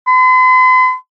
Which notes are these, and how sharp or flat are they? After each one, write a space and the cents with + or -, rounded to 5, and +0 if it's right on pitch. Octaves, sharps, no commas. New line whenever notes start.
C6 -45